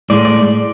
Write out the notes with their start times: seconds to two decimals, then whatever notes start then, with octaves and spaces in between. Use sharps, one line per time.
0.10 A2 G#3 D5
0.25 D5